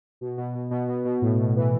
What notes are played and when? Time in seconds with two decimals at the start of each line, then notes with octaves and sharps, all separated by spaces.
0.21 B2
0.38 B2
0.54 B2
0.71 B2
0.88 B2
1.05 B2
1.22 A2
1.38 A2
1.56 E3